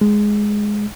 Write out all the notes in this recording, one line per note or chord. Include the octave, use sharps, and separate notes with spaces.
G#3